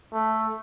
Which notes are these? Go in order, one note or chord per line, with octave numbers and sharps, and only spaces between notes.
A3